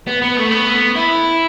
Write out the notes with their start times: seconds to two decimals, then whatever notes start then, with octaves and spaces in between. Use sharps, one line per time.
0.07 B3
0.22 B3
0.37 A3
0.51 B3
0.96 E4